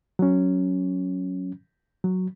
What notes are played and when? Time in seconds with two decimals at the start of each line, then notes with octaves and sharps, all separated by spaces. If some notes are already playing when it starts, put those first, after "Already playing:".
0.19 F#3 C#4
2.04 F#3